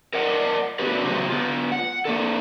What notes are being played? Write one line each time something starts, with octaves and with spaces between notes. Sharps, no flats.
A#4 D5 D#5 F#5
A3 B3 D4 F#4 G4 B4
C#3 F#3 G4 C5
B3 F4
F#5
A#3 D4 A4